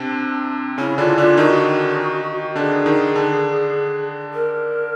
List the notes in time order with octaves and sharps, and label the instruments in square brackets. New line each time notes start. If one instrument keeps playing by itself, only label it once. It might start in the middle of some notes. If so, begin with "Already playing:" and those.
Already playing: [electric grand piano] C3 C4 [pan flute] D4
[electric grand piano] C#3 C#4 [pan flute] E4
[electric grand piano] D3 D4 [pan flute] F4
[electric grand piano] D3 D4 [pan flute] F4
[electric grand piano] D#3 D#4 [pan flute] F#4
[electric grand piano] D3 D4 [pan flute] G#4
[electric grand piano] D#3 D#4
D3 D4
[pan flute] A#4